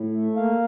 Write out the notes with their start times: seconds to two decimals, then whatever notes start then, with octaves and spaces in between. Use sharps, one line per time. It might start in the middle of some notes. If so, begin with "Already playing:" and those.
Already playing: A2
0.13 A3
0.36 A#3 F5